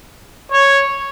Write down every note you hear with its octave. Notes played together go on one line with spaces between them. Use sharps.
C#5